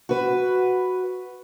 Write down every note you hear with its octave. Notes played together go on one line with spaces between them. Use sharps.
F#4 B4